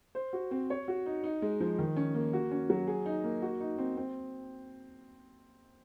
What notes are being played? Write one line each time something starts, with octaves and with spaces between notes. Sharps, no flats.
C5
F#4
C4
C#5
F#4
D#4
D#4
G#3
F3
D#3
C#4
A#3
F#4
C#4
F#3
G#4
D#4
A#3
F#4
D#4
C4
C4